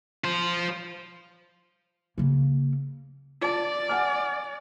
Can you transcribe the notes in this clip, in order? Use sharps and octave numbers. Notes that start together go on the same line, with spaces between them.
F4 C5
C#3 A#3
F4 D5 A5
F#5 G#5 F6